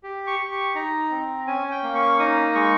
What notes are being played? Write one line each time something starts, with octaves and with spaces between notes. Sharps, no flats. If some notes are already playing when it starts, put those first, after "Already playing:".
G4
C#6
G4
C#6
D#4 A#5
C4
C#4 G#5
G5
A#3
C#6
D#4 D#6
G#3 C#6